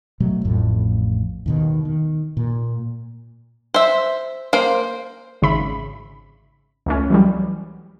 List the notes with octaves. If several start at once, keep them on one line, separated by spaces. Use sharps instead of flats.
B2 F#3 A3
A1 F2 A2
D#2 B2 D#3
D#3
A#2
C5 E5
A#3 C5
G#1 C#3 E5 B5
C#2 A3 C#4
E3 F#3 G3